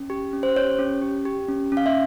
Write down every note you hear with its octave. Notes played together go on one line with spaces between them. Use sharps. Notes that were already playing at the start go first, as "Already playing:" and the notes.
Already playing: C#4
G4
C#4
C5
G4 C#5
C#4
G4
G4
C#4
C#4
F5
E5